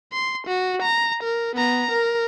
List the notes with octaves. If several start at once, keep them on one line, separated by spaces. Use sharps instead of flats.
C6
F#4
A#5
A#4
B3 A#5
A#4